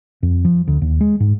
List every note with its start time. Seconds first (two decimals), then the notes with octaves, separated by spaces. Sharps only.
0.23 F2
0.45 F3
0.68 D2
0.82 D#2
1.01 G#3
1.20 G#2